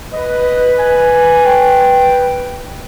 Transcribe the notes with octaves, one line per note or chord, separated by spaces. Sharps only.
B4 D#5
G#5
G5